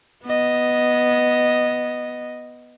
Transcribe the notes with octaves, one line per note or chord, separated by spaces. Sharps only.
B3 D#5